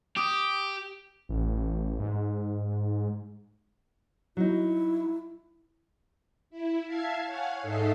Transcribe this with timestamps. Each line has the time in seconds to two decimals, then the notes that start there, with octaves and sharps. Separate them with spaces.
0.17 G4 D6 D#6 D7
1.29 A1
2.00 G#2
4.37 F#3 D#4 E4
6.50 E4
6.86 E5 F5 A5 G#6 C7
7.26 C#5 F5 F#5 G#5
7.61 G#2 D#4 A4 E5 D#6 C7